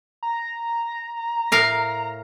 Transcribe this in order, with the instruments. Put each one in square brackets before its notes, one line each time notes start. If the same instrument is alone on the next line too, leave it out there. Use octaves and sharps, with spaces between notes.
[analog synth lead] A#5
[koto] A2 A#4 F5